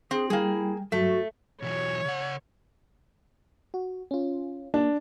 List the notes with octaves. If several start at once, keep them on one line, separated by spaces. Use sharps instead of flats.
C4 G#4
G3 A#3 E4 G#4 G5
G2 F#3 A3 F#4
B2 E3 F#3 C#5
C#3 F#5
F#4
C#4 F4
A#3 D4